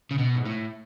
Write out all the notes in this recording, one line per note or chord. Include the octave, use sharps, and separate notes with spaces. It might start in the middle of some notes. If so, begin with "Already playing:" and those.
C#3
B2
G#2
A2